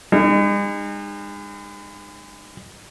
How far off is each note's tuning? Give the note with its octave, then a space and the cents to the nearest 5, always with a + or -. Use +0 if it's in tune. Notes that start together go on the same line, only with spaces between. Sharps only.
G#3 -40 D#4 -35